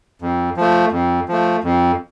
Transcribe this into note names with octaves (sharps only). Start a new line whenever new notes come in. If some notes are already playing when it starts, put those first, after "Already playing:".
F2
F3 A3
F2
F3 A3
F2